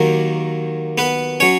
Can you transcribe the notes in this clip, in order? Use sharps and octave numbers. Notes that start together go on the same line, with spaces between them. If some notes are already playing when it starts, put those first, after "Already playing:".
Already playing: D#2 D#3 F#3 A#3 A#4
B3 B4
F#3 C#4 C#5